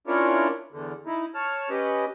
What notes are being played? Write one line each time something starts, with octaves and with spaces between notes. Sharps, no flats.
C#4 D4 E4 F4 A#4 C#5
E2 D3
D#4 E4
C#5 A5 F6
C#4 G4 B4 D#5